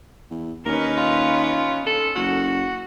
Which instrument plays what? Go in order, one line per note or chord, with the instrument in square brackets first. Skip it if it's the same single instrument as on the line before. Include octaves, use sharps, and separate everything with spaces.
[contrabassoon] E2
[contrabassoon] D#2 [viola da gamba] C#4 D#4 B4 [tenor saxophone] A#4
[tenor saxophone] F4
F4
[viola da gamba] C#4 [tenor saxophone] A4
[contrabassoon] F#1 [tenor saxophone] F#4